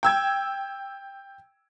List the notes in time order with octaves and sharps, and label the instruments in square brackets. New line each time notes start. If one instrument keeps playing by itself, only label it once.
[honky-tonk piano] G5 E6 G#6